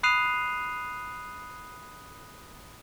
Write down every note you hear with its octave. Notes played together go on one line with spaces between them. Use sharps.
B5 D#6 F#6 C7 D#7 F7